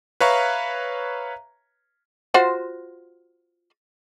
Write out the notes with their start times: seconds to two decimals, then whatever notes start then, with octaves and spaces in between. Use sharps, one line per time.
0.20 B4 C#5 E5 F5 A#5 C#6
2.34 F4 F#4 C5